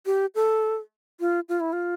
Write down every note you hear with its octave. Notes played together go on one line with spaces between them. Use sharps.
G4
A4
F4
F4
E4
F4